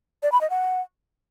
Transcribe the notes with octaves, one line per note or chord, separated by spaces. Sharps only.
D5
B5
D#5
F#5